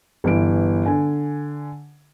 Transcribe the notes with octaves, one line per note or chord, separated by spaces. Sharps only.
G1 E3 D7
D3 G#5